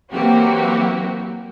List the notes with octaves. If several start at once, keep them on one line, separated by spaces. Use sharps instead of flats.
E3 F#3 A#3 C4 F#4 G4